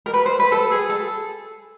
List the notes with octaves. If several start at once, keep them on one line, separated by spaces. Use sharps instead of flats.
A#4
B4
C5
B4
A4
G#4
A4